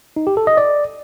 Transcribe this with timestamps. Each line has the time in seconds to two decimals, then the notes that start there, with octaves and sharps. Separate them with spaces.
0.16 D#4
0.27 G4
0.37 A4
0.47 D#5
0.57 D5